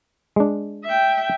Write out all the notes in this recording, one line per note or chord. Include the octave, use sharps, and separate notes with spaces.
G#3 D4
E5 G5